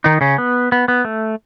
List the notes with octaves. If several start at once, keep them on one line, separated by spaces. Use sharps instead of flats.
D#3 D#4
C#3 C#4
B3
B3
B3
A3